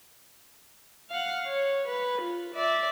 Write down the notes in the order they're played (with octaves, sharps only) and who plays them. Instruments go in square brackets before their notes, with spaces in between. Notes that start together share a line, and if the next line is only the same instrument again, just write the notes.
[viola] F5 F#5
C#5
B4
F4
D5 E5